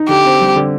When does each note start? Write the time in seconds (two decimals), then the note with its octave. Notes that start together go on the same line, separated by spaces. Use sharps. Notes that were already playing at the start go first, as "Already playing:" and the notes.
Already playing: D#4
0.08 D3 G4
0.25 C4
0.41 G3
0.56 D3